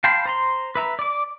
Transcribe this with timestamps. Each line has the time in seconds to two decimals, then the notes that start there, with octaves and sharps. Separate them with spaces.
0.04 F5 G5 A5 B5 C6
0.26 C5 A#5 C6
0.75 B4 E5 A#5
0.99 D5 D6